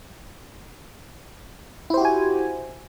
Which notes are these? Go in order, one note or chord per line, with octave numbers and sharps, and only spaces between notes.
E4 F#4 G4 C5 G#5